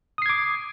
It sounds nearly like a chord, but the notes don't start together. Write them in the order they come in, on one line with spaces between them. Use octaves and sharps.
D#6 C7 G#6 D6